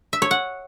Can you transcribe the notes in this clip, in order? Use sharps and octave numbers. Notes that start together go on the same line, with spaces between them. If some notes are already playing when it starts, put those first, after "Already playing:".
E5
C#5
F#5